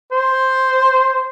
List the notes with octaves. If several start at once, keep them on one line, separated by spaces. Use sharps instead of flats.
C5